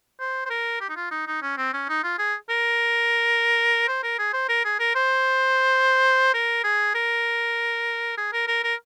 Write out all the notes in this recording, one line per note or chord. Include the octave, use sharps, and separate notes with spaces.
C5
C5
A#4
G4
D#4
F4
D#4
D#4
C#4
C4
C#4
D#4
F4
G#4
A#4
C5
A#4
G#4
C5
A#4
G#4
A#4
C5
A#4
G#4
A#4
G#4
A#4
A#4
A#4